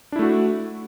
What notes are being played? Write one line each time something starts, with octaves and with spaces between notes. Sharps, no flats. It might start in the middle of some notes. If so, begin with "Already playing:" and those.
A3 D4 E4 F#4